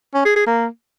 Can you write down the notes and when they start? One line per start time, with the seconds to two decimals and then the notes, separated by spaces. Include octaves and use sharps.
0.14 C#4
0.25 G#4
0.36 G#4
0.47 A#3